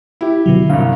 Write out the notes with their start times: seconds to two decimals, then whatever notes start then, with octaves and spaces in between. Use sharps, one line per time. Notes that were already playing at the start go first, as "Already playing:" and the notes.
0.21 E4 G4
0.46 B2 D3 F#3
0.70 C2 G2 F5